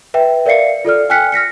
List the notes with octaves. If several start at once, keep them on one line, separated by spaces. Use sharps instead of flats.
B4 E5 G5
A#4 D5 E5 F5 C7 C#7
F4 A4 D5 F6
G5 G#5 F6 F#6 B6 C#7
F6 A#6 B6 C#7